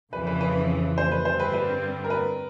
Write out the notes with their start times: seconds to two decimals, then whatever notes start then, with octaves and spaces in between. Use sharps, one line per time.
0.13 F2 C#3 E3 B4
0.27 B4
0.41 B4
0.98 C5
1.11 B4
1.25 G2 D3 G3 C4 C5
1.40 B4
1.54 B4
2.04 A#4
2.10 B4